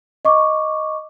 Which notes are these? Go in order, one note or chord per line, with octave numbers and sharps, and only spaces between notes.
D#5 C#6 D6